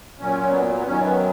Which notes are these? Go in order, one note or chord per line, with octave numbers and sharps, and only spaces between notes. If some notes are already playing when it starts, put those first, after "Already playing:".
A#2 F#3 C#4
B3
A#3
B3
F#2 D#3 F#3 C#4
B3